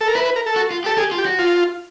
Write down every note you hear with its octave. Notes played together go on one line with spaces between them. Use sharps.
A4
A#4
E4 B4
B4
A#4
A4
F#4
F4
G4 A4
G4 G#4
F4
G4
F#4
F4